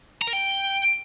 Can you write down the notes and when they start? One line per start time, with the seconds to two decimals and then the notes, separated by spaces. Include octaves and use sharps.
0.22 A#5
0.27 A#4
0.33 G5